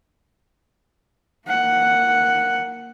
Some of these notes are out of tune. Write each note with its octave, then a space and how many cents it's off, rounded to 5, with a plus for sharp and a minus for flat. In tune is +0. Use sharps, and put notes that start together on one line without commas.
A#3 +0 F#5 +0